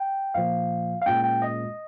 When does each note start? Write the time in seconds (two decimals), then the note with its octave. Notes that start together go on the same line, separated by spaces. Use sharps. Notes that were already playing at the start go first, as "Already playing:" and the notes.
Already playing: G5
0.34 A#2 F3 A#3 F5
1.02 F5
1.06 A#2 G#3 C#4 G5
1.24 G5
1.42 D#5